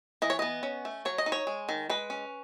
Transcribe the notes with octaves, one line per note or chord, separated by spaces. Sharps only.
E3 D#5
C#5
B3 D#5
C#4
A3
F#3 C#5
D#5
D#4
C#5
G#3
D#3
G#3 B4
C#4